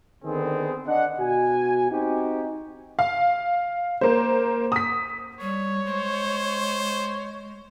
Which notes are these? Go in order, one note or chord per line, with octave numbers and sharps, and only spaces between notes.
D3 D#3 B3 C4 G#4
D4 D#5 F#5
B2 F#4 G#5
C4 D#4 F#4 G4
F5
A#3 C5
D#6 B6
G3 C#5
G#3 C5